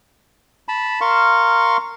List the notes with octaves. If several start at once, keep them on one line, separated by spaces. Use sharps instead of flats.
A5 B5
A#4 F5 C6 C#6